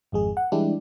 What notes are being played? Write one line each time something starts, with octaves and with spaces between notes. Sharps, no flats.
G#1 F2 G#3 G#4
F#5
E3 G3 G#3 D4 E4 G4